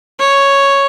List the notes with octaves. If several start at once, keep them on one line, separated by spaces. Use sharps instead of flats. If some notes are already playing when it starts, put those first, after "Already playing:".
C#5